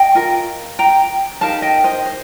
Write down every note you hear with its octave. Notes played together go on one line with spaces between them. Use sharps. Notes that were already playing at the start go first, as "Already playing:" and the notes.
Already playing: D#5 G5
F4 A#4
G5 A#5
D#4 G4 A#4 F5 A5
D#5 G5
C5 D#5
C5